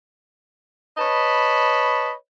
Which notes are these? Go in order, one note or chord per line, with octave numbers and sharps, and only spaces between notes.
B4 C#5 D#5 A5 B5